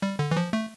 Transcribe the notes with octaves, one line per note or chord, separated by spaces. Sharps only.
G3
D3
E3
F3
A3